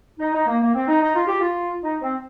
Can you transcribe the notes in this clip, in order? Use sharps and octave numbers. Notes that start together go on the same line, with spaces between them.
D#4
D#4
A#3
A#3
C4
D#4
D#4
F4
G4
F4
D#4
C4